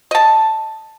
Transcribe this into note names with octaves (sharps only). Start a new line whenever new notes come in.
D#5 A5